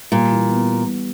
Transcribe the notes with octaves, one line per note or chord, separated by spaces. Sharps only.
A#2 G3
E3
B3